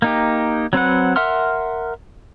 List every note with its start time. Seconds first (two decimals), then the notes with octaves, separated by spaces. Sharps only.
0.02 A#3 D#4 G4
0.73 F#3 C4 B4 F#5
1.16 A#4 E5 F#5 C6 F6